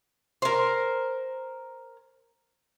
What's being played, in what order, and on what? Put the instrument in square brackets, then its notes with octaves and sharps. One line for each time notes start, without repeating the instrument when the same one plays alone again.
[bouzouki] A#4 C5